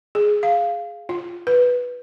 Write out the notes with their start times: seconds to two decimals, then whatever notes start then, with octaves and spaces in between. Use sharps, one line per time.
0.15 G#4
0.43 F5
1.09 F4
1.47 B4